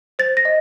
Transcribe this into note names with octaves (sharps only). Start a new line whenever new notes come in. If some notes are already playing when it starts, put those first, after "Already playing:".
C5 A6
A#6
D#5